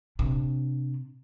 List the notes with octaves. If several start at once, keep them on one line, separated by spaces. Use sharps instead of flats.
C3 D4